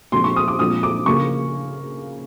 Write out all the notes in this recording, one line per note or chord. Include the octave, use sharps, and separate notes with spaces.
A#2 F3 G#3 C4 C6
C#6
D#6
D6
A#2 F3 G#3 C4 D#6
D6
C#3 F3 A#3 C#6